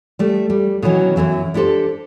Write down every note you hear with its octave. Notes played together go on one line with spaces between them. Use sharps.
G3 A3
G3
B2 D#3 E3 F#3 C#4
F#2 A#2 E3 F#3
D4 E4 G4 A4 C5